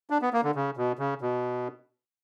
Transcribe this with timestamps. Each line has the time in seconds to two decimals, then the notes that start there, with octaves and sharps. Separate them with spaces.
0.10 D4
0.22 B3
0.33 A#3
0.44 D3
0.55 C#3
0.77 B2
0.99 C#3
1.21 B2